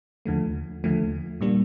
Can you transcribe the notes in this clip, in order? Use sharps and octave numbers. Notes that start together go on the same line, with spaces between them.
D#2 D3 F3 A3
D#2 D3 F3 A3
A#2 G3 A#3 D4